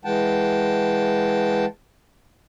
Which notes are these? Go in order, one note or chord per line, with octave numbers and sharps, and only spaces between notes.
E3 G#3 F#5 G5 A5